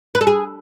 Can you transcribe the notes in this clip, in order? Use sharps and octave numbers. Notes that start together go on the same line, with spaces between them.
B4
A4
G#4